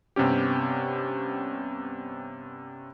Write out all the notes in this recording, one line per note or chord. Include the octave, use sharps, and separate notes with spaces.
G2 C3 B3 C#4 G4